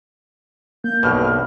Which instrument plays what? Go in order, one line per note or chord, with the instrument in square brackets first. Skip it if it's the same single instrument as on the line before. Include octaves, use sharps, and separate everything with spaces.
[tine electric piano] A#3 [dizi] G6
[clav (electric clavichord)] B1 G2 B2 [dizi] F6